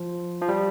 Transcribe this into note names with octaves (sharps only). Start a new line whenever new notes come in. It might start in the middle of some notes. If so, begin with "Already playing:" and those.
Already playing: F3
F3
G3